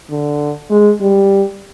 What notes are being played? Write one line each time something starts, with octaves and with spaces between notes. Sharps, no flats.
D3
G#3
G3